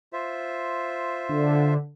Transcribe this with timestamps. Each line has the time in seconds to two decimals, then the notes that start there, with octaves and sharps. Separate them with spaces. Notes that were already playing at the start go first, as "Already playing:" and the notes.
0.13 F4 C5 E5
1.29 D3